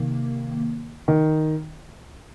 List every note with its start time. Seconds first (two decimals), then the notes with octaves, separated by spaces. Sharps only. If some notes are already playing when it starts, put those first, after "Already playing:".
Already playing: C3 D#3 A#3
1.08 D#3